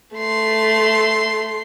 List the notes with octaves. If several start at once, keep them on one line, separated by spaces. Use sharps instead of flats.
A3 C6